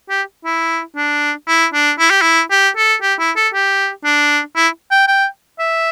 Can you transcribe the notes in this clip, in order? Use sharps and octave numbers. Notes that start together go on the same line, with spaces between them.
G4
E4
D4
E4
D4
E4
G4
E4
G4
A4
G4
E4
A4
G4
D4
E4
G5
G5
E5